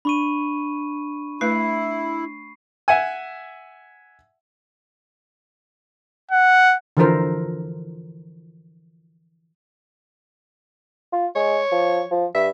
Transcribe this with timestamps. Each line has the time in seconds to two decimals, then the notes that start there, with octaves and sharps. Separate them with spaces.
0.05 D4 B5 C#6 D#7
1.41 A3 E4 B4 C7
2.88 E5 F#5 G#5
6.31 F#5
6.97 D3 E3 F3 A4 A#4 C5
11.13 F4
11.36 G#3 C#5
11.72 F3
12.11 F3
12.35 G2 E5